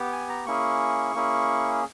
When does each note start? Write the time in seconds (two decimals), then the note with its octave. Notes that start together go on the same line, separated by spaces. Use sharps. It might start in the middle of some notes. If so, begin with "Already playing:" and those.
Already playing: B3 G4
0.12 G#5
0.29 A#5
0.46 A#3 C#4 E4 G#4 C#6
1.15 A#3 C#4 E4 G#4